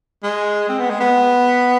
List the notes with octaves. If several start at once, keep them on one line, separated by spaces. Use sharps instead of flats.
G#3
C4
B3
G#3
B3